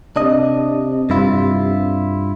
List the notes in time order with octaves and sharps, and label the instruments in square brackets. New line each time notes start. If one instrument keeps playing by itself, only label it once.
[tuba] C3 [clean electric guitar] D4 D#5
[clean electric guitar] G2 E4 F4